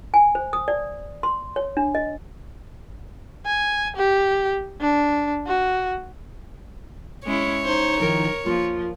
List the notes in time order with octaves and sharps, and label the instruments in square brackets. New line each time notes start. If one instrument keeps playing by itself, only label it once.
[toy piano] G#5
C5
D#6
D5
C6
C#5
D4
D#5
[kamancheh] G#5
G4
D4
F#4
[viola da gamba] G#3 C#4 E4 [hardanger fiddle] C#5
[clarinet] D#4 [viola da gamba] C5
[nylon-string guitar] D#3 F3 E4 [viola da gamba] A#4
[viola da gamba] F3 [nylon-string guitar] A#3 [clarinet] F4